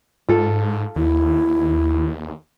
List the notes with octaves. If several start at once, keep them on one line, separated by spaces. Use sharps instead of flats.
G#2 F4 A4
D#2 E4